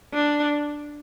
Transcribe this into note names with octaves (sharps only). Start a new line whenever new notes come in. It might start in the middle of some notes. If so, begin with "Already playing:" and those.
D4